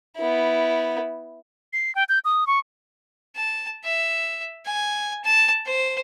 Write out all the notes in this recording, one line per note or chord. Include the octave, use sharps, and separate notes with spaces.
B3 E4
C7
G5
G6
D#6
C#6
A5
E5
G#5
A5
C5